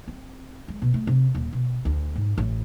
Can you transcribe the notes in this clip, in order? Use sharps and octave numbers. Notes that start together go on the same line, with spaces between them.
C4
G#3
B2
A3
C3
D#1
B2
D2
G#2
A1